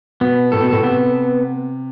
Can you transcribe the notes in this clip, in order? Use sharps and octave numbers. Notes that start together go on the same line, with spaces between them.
B2 B3
A2 A4
B2
A2
C3 B3